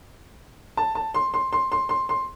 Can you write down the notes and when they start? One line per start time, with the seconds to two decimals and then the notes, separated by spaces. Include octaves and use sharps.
0.77 A5
0.95 A5
1.14 C6
1.34 C6
1.53 C6
1.72 C6
1.89 C6
2.09 C6